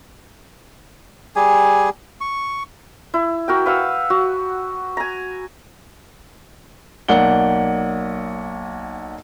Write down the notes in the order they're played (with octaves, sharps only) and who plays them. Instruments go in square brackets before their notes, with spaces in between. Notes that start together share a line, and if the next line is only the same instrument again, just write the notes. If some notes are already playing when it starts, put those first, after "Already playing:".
[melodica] G3 G4 G#4 G#5
C#6
[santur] E4
F#4 A#4 G5
B4 F5 F#5 E6
F#4
G#5 A#5
[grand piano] B1 A#3 D5 F#5 G7